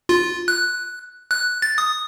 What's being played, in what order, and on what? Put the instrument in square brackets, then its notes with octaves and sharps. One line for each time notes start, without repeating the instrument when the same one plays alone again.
[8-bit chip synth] F4
F#6
F#6
A6
D#6